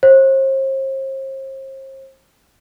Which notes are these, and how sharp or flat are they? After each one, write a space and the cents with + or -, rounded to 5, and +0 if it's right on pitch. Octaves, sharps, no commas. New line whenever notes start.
C5 +40